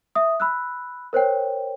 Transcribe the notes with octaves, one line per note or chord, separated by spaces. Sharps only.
E5 D#6
B5 E6 F#6
A#4 C5 C#5 G5